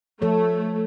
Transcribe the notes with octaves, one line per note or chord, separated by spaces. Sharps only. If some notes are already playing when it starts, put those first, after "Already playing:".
F3 A3 A4 C#5